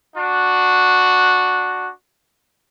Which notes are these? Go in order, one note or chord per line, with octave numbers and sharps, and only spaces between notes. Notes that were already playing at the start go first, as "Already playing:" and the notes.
D4 F#4